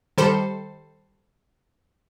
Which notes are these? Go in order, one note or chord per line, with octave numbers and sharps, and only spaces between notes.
D#3 G3 A4 C5